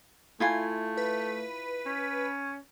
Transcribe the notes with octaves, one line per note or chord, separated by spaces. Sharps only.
A3 E4 F4 G#5
B4
C#4